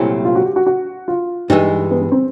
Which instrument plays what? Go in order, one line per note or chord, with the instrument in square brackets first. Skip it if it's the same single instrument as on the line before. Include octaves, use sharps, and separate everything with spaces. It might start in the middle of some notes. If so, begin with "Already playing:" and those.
Already playing: [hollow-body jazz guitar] C2 A#2 F#3 A3 C4 [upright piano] E4
[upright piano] F4
F#4
G4
F#4
F#4
F4
[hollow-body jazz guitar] G2 E3 G#3 [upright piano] D#4
[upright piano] B3
B3
C4